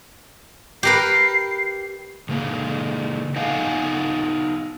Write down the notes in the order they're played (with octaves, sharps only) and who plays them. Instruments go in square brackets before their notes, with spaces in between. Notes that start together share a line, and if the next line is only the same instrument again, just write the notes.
[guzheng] G4 A#4 B4 [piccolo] C7
[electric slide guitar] C#3 G#3 A#3
B3 D#4 D#5 F5 F#5 G#5